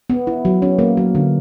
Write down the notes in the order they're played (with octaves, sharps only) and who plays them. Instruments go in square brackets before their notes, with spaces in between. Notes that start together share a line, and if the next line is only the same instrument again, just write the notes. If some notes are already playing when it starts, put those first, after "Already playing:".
[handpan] B3
E4
F#3
C#4
A#3
F#3
D3